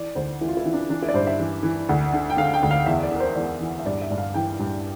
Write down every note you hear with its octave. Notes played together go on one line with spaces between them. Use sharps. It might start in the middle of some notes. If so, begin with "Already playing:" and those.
Already playing: E3 D5
D2 C5
E3 E4
F4
E4
E3
D4
E3 D4
E4
D5
G2 C5
E5
E3
E3
D2
D3
G5
D3 F5
G5
D2
F5
E2 E5
D5
E3 A#4
C5
E2 D5
E3
E5
G2 D5
E5
G2
F5
E3 G5
G2